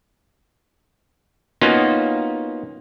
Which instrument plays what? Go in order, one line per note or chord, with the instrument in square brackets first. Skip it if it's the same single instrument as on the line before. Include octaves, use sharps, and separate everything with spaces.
[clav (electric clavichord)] A#3 B3 C#4 D#4 F4 F#4